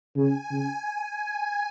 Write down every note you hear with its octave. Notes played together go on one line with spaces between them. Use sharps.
C#3 G#5
C#3